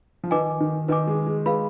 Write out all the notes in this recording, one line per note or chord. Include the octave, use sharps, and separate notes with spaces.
F3
D#3 B4 D#5 G#5 D6
D#3
D#3 B4 D#5 G#5 D6
G#3
G#3
G#3 B4 F5 B5